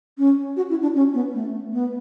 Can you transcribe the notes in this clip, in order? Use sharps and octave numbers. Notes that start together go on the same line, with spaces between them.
C#4
F#4
E4
D4
C#4
B3
A3
B3